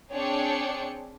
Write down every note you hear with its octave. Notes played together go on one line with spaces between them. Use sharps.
C4 D4 G#4 C#5 G5 C#7